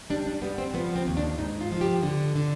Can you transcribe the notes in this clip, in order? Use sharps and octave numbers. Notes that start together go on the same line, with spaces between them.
G3 D4
D4
G3 B3
C4
F3 B3
C4
D#2
D4
G#2 D#4
F4
F3
G4
D3
D3